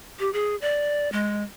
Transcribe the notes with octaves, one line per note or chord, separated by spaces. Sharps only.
G4
G#4
D5
G#3